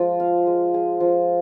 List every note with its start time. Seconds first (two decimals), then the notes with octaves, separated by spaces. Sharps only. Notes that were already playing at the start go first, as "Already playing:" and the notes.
Already playing: F3 G#3
0.20 F5
0.47 G#3
0.74 G#4
1.00 F3